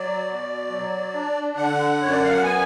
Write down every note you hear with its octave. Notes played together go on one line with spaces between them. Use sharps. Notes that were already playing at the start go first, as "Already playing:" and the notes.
Already playing: F#3 D5
B2
F#3
D4
D3 F#5
F#2 C#5
D5
F5
F#5
B3 G#5